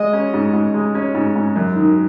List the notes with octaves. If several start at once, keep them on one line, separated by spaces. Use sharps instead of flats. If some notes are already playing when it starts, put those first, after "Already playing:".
Already playing: G#3 D#5
C#4
G#2
G#2
G#3
C#4
G#2
G#2
F#2
D#3